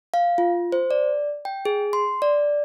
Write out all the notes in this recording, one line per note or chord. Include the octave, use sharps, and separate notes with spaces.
F5
F4
C5
D5
G5
G#4
C6
D5